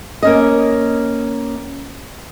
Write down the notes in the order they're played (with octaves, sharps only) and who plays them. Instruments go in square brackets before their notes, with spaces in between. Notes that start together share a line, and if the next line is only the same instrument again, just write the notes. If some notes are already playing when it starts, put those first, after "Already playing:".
[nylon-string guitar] A#3 C#4 D#5